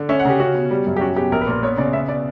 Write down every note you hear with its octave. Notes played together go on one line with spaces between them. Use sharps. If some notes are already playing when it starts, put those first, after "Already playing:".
Already playing: D3
C#4 E5
F#5
C#3 G4
C#4 F#4
B2
G3
F#2
G4
C#4 F#4
B2 G4
A#1 A#4
B4
A#2 A#4
B3 C#5
C#3 D5
B3 E5
B2 D5